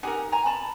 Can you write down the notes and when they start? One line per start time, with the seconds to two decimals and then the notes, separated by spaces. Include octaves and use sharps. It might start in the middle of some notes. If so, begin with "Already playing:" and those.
0.03 D#4 G4 A#4 F#5 G#5
0.32 G#5 A#5
0.46 A5 B5